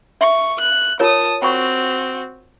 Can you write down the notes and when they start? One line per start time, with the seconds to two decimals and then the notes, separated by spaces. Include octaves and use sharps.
0.21 E5 C#6
0.60 F#6
1.00 F4 A#4 C#5 A5 D#6
1.42 C4 F#4 G5 B5 C#6